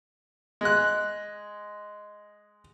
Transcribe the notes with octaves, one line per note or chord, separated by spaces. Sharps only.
G#3 F#6